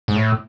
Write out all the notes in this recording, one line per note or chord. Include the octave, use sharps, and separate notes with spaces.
G#2
A2